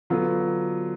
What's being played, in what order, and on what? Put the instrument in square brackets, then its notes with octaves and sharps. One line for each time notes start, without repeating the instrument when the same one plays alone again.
[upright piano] D3 F#3 B3 F4